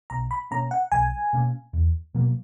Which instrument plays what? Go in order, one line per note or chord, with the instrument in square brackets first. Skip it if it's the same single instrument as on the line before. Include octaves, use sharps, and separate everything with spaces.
[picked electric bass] B1 [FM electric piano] A#5
[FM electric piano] B5
[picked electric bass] B2 A#3 C#4 [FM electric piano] A#5
[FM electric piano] F#5
[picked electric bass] B1 [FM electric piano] G#5
[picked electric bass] B2 A#3 C#4
E2
B2 F#3 A#3